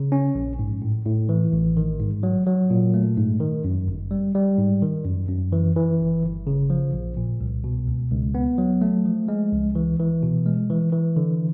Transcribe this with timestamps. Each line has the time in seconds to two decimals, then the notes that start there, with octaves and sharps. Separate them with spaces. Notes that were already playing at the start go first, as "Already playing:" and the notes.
Already playing: C#3
0.12 C#4
0.35 A#1
0.59 G#2
0.82 A2
1.05 A2
1.29 E3
1.53 A1
1.77 D#3
2.00 G#2
2.23 F#3
2.47 F#3
2.70 A#2
2.94 A3
3.17 G#2
3.40 D#3
3.64 F#2
3.88 G1
4.11 G3
4.35 G3
4.58 G#2
4.82 D#3
5.05 F#2
5.29 F#2
5.52 E3
5.76 E3
5.99 G1
6.23 G1
6.47 C#3
6.70 F3
6.93 A#1
7.17 A#2
7.41 C2
7.64 B2
7.88 C#2
8.11 C#2
8.35 B3
8.58 F#3
8.81 A3
9.06 F3
9.28 G#3
9.52 C#2
9.75 E3
9.99 E3
10.23 B2
10.46 G#3
10.70 E3
10.93 E3
11.16 D3